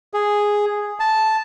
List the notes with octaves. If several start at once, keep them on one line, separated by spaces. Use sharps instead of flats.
G#4
A5